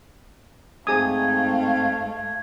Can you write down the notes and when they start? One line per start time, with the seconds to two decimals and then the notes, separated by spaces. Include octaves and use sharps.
0.87 G#2 A3 C4 D#4 G#4 F5 D#6 G#6